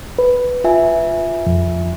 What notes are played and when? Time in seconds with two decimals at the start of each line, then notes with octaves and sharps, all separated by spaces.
0.19 B4
0.64 F4 E5 G#5
1.47 F2